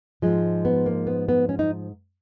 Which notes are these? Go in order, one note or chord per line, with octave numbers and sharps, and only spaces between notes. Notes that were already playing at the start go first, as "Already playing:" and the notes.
G#2 F3 G#3
B3
A#3
B3
B3
C#4
D#4